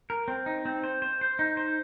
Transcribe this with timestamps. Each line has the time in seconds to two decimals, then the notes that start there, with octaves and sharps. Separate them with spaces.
0.10 A#4
0.28 C4
0.46 D#4
0.65 C4
0.84 C5
1.02 C5
1.21 C5
1.39 D#4
1.57 C5